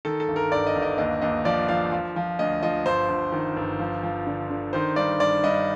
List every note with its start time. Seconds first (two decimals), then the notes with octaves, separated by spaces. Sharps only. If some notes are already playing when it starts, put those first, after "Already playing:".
0.05 D#3 A4
0.20 A4
0.28 G1
0.36 A#4
0.52 G1 D5
0.67 D#5
0.76 G1
0.82 D#5
0.98 D#2 D#5
1.22 D#2 D#5
1.45 F3 D5
1.69 F3 F5
1.92 F3
2.16 F3
2.39 D2 D#5
2.62 F3 D#5
2.85 G1 C5
3.09 G1
3.32 D#3
3.56 G1
3.79 F3
4.03 F3
4.27 D3
4.50 D3
4.73 D#3 C5
4.96 G2 D5
5.20 G2 D5
5.43 G2 D#5